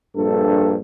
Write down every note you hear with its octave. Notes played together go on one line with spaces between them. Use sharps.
A#1 G2 A4